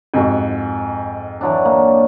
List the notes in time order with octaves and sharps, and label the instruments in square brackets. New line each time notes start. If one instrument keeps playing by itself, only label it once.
[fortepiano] F2 G#2 F#4
[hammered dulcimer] E3 F#3 D4
A#3